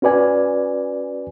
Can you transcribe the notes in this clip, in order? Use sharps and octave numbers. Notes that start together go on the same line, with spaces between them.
C#4 F#4 B4 D5 G#5